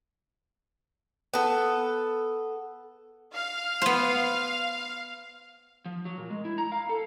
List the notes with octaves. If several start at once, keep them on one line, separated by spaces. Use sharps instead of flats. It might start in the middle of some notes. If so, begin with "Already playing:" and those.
B3 A4
F5
B3 C5
F3
F#3
A#2
G#3
E4
A#5
F5
A4